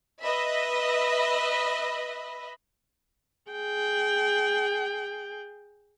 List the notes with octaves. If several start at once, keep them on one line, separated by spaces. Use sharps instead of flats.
B4 D#5 E5 B5
G#4 G5